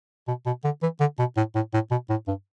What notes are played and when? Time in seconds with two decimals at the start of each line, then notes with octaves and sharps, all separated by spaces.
0.28 B2
0.46 B2
0.64 D3
0.83 E3
1.00 D3
1.19 B2
1.37 A2
1.55 A2
1.74 A2
1.91 B2
2.10 A2
2.28 G2